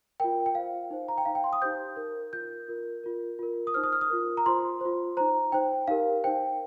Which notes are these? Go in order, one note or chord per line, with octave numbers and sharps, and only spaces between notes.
F4 A#4 G5
G5
F4 C5 F5
D#4 C5
A#5
G5
D#4 C5 F5
G5
C6
D#6
D#4 G4 C5 G6
D#4 A#4
F4 A#4 G6
F4 A#4
F4 A#4
F4 A#4
D#6
D#4 C5 F6
D#6
F6
D#6
F4 A#4
A#5
F4 C5 C6
F4 C5
D#4 C5 A#5
D#4 C5 G5
D#4 G4 A#4 F5
D#4 C5 G5